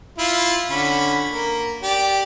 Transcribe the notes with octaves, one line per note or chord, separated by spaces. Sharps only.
E4 F4
D3 C#4 B5
A#3
G4 D5